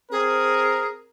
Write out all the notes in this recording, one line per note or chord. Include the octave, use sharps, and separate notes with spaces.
C4 G#4 A#4